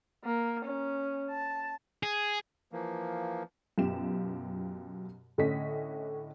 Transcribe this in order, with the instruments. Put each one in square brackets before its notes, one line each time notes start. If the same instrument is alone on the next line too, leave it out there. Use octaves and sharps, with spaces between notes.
[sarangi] A#3
C#4
A5
[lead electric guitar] G#4
[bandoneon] E3 F3 A#3
[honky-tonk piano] F#2 B2 F4 G4 E7
A2 D3 A3 C#4 D#5 B6